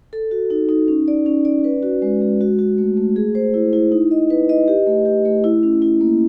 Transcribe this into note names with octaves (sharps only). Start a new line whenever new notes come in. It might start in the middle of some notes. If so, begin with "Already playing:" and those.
A4
F#4
D#4
D#4
C#4
D5
C#4
D5
B4
F#4
G#3
G#3
F#4
F#4
A3
A3
G#4
C5
E4
E4
D#4
D#5
B4
D#5
G4
A3
G4
A3
E4
C#4
E4
A#3